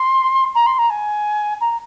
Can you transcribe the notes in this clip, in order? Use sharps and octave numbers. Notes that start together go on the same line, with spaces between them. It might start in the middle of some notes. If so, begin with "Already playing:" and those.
Already playing: C6
A#5
C6
A#5
G#5
A#5